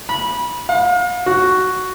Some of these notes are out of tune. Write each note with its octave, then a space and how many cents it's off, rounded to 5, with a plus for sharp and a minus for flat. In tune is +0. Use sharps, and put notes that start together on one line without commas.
B5 -25
F5 +40
F#4 +5